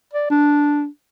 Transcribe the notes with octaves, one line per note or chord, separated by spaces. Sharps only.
D5
D4